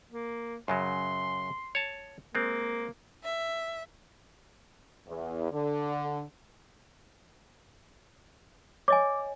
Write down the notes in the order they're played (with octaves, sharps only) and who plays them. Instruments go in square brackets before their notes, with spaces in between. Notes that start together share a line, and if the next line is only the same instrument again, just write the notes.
[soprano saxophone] A#3
[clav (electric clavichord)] F#2 C#3 F#3 [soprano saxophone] C6
[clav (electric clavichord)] C#5 A5
[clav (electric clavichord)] G#3 C4 [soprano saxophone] A#3
[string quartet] E5
[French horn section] E2
D3
[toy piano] C#5 D#5 G#5 [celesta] D6